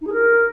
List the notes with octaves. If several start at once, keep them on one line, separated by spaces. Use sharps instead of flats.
D#4
G#4
A#4